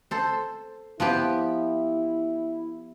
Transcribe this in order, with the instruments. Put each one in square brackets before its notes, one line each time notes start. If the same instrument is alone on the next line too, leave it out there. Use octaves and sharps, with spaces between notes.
[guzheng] A4 C5
[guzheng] F3 B3 G4 [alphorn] E4